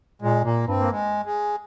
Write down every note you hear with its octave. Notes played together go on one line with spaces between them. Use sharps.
A#2 G#3
A#2 A#3
G2 C4
A#3
G#3
G#3